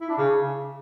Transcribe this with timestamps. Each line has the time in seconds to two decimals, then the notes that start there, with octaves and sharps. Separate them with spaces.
0.01 E4
0.10 D4
0.18 C#3